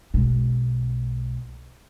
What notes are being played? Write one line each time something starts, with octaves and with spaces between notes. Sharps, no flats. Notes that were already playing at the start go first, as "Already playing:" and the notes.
B1 G#3